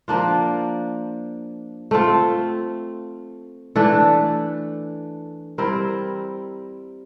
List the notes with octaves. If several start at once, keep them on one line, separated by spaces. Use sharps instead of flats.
F3 A#3 D4 F4
A3 C4 F4
E3 A3 D4 A4
G3 C4 E4 A#4